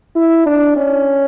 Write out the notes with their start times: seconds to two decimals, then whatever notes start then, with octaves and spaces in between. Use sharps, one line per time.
0.15 E4
0.46 D4
0.77 C#4